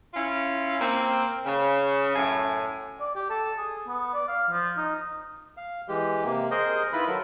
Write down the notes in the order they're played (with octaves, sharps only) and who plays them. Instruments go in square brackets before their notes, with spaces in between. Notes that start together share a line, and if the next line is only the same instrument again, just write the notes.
[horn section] C#4 E4 F4
A#3 C4
C#3
F#2 A2 G#5
[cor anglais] D5
G4
A4
G#4
B3
D5
F5
F3
D#4
[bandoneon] F5
E3 G#3 G4
C3 A#3
G#4 A#4 C5 D#5
D#3 E4 F4 B4 B5 F#6
F#3 A4 A#4